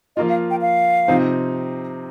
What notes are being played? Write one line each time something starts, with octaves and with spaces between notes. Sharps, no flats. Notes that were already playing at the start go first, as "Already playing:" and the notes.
F3 A#3 F4 D#5
F5
G5
F5
C3 F3 C4 D#4